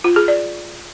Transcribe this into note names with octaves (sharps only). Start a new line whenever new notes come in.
F4
G#4
D5